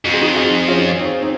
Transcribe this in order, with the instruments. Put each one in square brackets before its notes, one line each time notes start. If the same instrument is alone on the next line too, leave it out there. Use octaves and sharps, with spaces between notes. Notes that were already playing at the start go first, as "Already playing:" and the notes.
[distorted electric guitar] F2 [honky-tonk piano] F#4
[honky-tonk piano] G#4
D#4 F#4
F4 G#4
C#4 F4
C4 D#4
C4 D#4